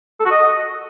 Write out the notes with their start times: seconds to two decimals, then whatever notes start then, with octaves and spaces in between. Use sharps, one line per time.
0.20 A4
0.25 F#4
0.31 D#5